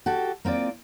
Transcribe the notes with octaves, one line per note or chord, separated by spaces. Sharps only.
F#4 G4 A4
A#3 C4 F4 D5